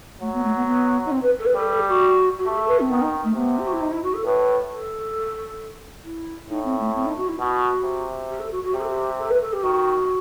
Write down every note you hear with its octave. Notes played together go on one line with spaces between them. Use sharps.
F#3 A3
B3
A3
B3
B3
D#4
C4
B4
A4
B4
G3 A4
A4
G4
F#4
F#4
A3 G4
A4
B4
C4
D#3 B3
D#4
A3
C3 B3
G4
F#4
E4
D#4
E4
F#4
A4
A2 B4
A4
E4
A2 D#4
C4
A3
C4
D#4
F#4
E4
B2 F#4
C3
G4
A4
F#4
F#4
C3 G4
A4
G4
A4
B4
A4
G4
D#3 F#4